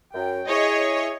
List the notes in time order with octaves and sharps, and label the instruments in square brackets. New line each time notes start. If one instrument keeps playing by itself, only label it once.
[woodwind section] F#2 G5
[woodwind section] E4 G#4 [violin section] C#5 D#5